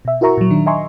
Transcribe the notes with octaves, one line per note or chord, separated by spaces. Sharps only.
B2 E5
E4 F#4 A#4 E5 A#5 C#6
A#2 F#3
D#3 D4
D#5 E5 G#5 A#5 C6 C#6